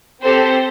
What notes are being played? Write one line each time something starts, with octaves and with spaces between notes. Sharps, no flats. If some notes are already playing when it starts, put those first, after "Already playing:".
C4 G4 A4 C5